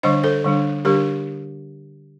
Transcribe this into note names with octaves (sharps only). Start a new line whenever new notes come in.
D3 G3 D4 C5 D#5
A4 C5
D3 G3 D4
D3 G3 D4 G4 A#4